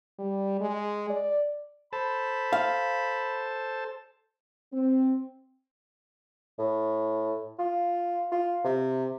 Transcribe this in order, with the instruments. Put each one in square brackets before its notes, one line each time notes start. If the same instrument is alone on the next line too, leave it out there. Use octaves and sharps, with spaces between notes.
[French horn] G3
G#3
D5
[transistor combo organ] A4 C5 A5 [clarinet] B5
[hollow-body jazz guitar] F5
[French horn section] C4
[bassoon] A2
F4
F4
C3